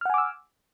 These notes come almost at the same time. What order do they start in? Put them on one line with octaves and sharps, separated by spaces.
F6 F#5 G#5 D6 E6